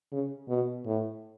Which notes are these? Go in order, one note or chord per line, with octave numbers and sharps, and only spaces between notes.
C#3
B2
A2